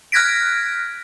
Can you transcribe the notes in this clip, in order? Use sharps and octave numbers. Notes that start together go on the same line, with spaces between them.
F6 F#6 G#6 A#6 B6 D7